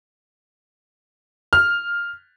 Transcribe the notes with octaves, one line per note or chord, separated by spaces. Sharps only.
F6